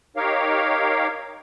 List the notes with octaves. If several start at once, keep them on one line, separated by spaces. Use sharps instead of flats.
D#4 G4 A#4 C#5 F5